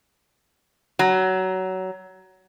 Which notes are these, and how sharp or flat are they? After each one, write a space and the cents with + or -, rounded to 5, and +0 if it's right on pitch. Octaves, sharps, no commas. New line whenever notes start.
F#3 +20